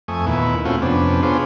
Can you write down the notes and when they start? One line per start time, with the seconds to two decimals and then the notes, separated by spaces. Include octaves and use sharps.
0.08 F2 A3 G#5 C#6 D#6
0.26 D#2 A#2 B3 E4
0.65 A3 C4 C#4 F4 F#4
0.82 F2 C3 B3 C#4 D4
1.23 B3 D4 F4 G#4 C5 C#5